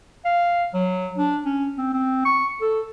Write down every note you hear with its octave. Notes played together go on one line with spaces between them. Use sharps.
F5
F#3
D4
C#4
C4
C4
C#6
A4